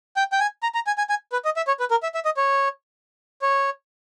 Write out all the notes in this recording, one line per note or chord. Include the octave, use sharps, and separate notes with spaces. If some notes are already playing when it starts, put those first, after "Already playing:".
G5
G5
G#5
A#5
A#5
G#5
G#5
G#5
B4
D#5
E5
C#5
B4
A#4
E5
E5
D#5
C#5
C#5